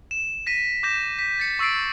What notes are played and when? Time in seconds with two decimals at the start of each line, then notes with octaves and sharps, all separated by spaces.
0.11 E7
0.46 A#6 B6 D#7
0.83 D6 G6 A#6 E7
1.19 B6
1.39 A6 C#7
1.59 C#6 E6 A6 C7 D7